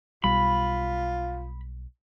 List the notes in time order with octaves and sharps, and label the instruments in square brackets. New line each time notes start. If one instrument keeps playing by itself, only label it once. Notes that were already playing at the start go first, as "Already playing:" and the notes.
[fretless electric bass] B1 G3 [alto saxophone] F4 [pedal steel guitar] B5